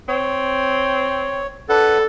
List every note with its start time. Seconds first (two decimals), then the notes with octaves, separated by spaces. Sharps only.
0.09 C4 C#5
1.69 D4 A4 B4 F#5